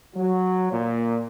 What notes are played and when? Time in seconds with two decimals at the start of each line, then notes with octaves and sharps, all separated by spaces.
0.16 F#3
0.72 A#2